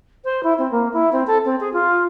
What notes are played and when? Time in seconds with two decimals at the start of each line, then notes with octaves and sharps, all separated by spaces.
0.24 C5
0.43 E4
0.58 C4
0.71 A#3
0.93 E4
1.12 C4
1.27 A4
1.45 C4
1.60 G#4
1.73 F4